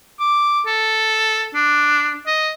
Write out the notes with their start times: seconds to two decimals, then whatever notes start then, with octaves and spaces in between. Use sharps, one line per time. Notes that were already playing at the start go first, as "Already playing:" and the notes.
0.20 D6
0.66 A4
1.55 D4
2.27 D#5